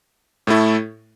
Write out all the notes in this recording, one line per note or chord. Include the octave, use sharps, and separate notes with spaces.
A2 A3 E4 A4